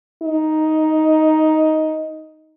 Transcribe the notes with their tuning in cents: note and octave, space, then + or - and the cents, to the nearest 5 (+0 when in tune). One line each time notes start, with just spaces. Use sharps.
D#4 +5